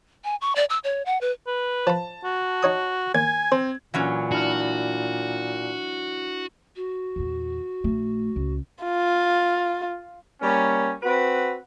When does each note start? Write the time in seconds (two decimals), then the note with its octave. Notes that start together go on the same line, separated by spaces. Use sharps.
0.24 G#5
0.41 C#6
0.56 D5
0.70 E6
0.84 C#5
1.06 F#5
1.21 B4
1.47 B4
1.87 F3 A5 B5
2.25 F#4
2.63 D#4 C#5 D#6
3.15 D#2 G#5 G#6
3.52 C4 C5
3.94 A#2 E3 F#3 C#4
4.32 D4 E4 F#4 F6
6.75 F#4
7.16 E2 A#2
7.84 A#1 A3
8.36 C#2
8.84 F4
10.42 G3 A#3 C#4
11.03 C4 F#4 B4